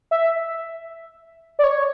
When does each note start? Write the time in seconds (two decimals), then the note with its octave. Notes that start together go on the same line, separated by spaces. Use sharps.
0.11 E5
1.59 D5
1.64 C#5